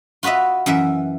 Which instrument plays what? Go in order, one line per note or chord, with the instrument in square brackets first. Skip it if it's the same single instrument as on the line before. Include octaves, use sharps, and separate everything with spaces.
[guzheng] F4 F#4 B4 D#5 E5
F#2 E3 E5